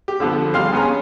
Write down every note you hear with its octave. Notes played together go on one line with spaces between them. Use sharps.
G4
D3 F3 B3
G#1 G3 F5 G5 C6 F6
B3 C#4 G#4 G#5 A#5
C#4